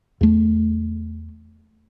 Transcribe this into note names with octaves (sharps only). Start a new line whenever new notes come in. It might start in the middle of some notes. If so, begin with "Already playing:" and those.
E2 A3